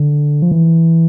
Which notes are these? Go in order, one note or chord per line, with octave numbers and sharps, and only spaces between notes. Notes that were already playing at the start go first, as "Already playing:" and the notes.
Already playing: D3
F3
E3